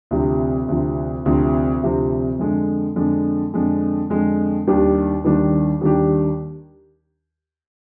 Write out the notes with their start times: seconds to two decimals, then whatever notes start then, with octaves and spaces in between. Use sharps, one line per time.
0.11 D2 C3 F3 C4
0.68 D2 C3 F3 C4
1.26 D2 C3 F3 C4
1.83 D2 C3 F3 C4
2.39 F2 D3 G#3
2.96 F2 D3 G#3
3.54 F2 D3 G#3
4.10 F2 D3 G#3
4.67 D#2 D#3 G3 D4 G4
5.24 D#2 D#3 G3 D4 G4
5.81 D#2 D#3 G3 D4 G4